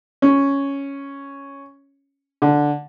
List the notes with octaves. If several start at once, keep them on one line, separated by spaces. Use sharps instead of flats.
C#4
D3